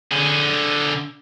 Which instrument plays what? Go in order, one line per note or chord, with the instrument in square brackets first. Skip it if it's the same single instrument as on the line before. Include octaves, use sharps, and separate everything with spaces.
[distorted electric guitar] D3 G#4